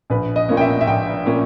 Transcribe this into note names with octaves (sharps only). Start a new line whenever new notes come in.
A#1 B4
D#5
A#2 A#3 C#4
G5
E5
E5
A#1 G5
A#2 A#3 C#4